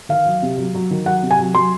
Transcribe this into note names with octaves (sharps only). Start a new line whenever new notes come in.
D#3 F5
F#3
C3
F#3
F#3
D#3
F#3 F#5
C3
G#5
F#3
F#3 C6